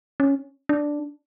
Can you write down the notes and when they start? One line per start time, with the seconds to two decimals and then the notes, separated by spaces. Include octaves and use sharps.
0.20 C#4
0.69 D4